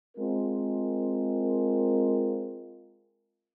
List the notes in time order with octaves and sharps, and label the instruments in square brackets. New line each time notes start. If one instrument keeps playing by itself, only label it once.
[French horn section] G#3 C4 F4 A#4